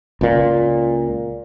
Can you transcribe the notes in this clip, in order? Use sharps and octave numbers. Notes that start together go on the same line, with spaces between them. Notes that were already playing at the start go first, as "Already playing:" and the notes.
C#2 A#2